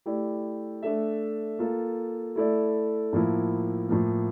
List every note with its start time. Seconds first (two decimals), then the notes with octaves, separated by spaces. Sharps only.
0.06 A3 E4 G4 D5
0.83 A3 D4 A4 E5
1.59 A#3 F4 A4
2.36 A3 E4 A4 D5
3.13 A2 F3 A#3 E4
3.89 A2 F3 A#3